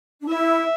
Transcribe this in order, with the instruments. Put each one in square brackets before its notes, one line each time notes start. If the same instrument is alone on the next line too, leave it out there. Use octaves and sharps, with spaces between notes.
[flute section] D4
[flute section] E4 [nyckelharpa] E5